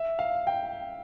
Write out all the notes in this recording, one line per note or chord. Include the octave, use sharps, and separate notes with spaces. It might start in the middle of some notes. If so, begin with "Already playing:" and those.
Already playing: E5
F5
G5